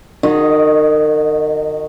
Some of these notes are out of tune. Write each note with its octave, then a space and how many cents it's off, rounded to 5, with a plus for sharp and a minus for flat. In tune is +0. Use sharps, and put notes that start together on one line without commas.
D#3 -35 F#4 -25 D#5 +0